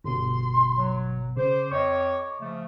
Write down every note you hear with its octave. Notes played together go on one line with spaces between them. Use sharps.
G1 B2 C6
F#3
C#3 C5 D6
F2 C#5 D#5 C#6
C#3 F3 A3